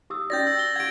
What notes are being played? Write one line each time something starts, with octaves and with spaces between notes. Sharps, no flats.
G4 D#6 E6
C#4 F#4 D5 G6 A6 A#6
E6
G7
G4 F#5 G#6 D7